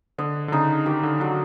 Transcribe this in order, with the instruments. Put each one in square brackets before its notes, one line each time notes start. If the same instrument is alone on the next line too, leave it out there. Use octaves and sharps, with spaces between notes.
[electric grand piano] D3 [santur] D#5
[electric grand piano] D3
[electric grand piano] C#3 [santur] D#4
[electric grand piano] D#3 [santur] G4
[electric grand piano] D3
[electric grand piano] D3 [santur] F#3